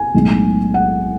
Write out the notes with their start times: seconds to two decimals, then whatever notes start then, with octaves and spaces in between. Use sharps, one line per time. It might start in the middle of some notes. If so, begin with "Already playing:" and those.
Already playing: G#5
0.14 B1 A2 G#3 B3
0.74 F#5